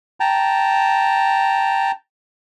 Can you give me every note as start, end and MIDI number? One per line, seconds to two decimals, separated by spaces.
0.20 1.91 79
0.20 1.91 81
0.20 1.91 82